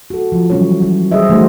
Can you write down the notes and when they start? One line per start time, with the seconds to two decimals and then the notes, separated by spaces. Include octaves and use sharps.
0.10 F#4 A4
0.32 F3
0.50 E3 F#3 G3 C#4 E4 C#5
0.82 F#3
1.12 G3 G#4 C5 C#5 D#5 E5
1.29 E3 A3 D#4 F#4 C5